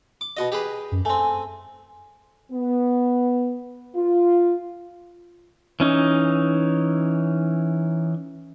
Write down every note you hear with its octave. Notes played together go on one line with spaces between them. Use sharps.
D6
B2 F#4 D#5
G4 G#4 B4
F#2
A3 C4 G#5
B3
F4
E3 C#4 D#4